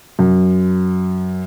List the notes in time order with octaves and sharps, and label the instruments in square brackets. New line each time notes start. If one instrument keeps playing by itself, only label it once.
[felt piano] F#2